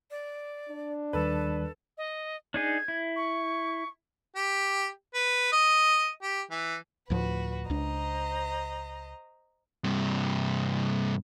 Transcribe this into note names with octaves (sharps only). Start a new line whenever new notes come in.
D5
D4
D#2 D#3 G3 A4 B4
D#5
D4 D#4 G#4 G#6
E4
C#6
G4
B4
D#5
G4
E3
D2 A2 F3 F#4 B4
C#2 D4 C5 D#5 A#5
G2 C3